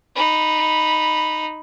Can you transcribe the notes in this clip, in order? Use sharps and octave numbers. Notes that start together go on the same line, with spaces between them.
D#4 B5